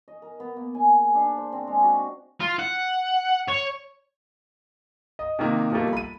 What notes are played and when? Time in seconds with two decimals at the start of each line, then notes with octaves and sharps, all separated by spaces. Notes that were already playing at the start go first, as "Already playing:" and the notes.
0.08 D#5
0.22 A#4
0.40 B3
0.57 A#3
0.75 G#5
0.99 G#4
1.15 D4
1.37 C5
1.52 C4
1.67 G#3
1.83 F#4
2.40 F4
2.59 F#5
3.48 C#5
5.19 D#5
5.39 C3 D#3 A#3
5.71 B2 F3 G3 A3 A#3
5.93 B5 D#7